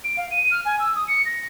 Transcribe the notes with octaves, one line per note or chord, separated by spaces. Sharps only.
D7
F5
D#7
F6
G#5
E6
D#6
C#7
A#6